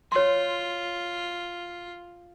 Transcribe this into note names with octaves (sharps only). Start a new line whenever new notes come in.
F4 C#5 C6